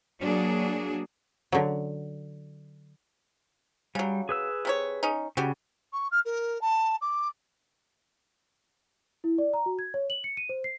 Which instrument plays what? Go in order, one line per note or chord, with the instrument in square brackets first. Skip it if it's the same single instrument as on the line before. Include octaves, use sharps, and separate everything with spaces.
[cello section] F#3 A#3 D4 F#4 G#4
[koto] D3 F#3
[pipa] C#3 F#3 [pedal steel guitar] G3
[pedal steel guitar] G#4 B4 E6
[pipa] C3 C#4 C#5
C#4 D#4
[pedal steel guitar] C#3 [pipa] G3 F#4 G4
[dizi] C#6
F6
A#4
A5
D6
[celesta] E4
D5
A#5
F#4
G#6
C#5
F#7
C#7
D#7
C5
C7